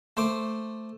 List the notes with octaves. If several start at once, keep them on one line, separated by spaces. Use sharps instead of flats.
A3 C5 D6